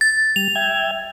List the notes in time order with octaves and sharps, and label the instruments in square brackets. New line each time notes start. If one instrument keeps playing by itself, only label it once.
[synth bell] A6
[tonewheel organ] G3 [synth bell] F7
[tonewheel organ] E5 G5 G#6